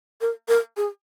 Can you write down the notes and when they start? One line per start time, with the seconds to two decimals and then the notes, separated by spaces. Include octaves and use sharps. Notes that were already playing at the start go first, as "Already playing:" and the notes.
0.21 A#4
0.48 A#4
0.77 G#4